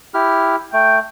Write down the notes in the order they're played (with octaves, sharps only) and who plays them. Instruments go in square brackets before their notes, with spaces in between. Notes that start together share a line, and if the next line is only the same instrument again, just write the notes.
[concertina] E4 G4 F6
[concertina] A3 [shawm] G5